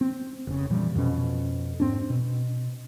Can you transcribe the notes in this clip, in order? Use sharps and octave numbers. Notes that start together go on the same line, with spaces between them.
C4
F1 C#3
A#2 E3 F3 G3
F2 B2 C#4
G#2 C4 D4
B2